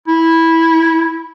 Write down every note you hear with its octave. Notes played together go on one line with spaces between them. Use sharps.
E4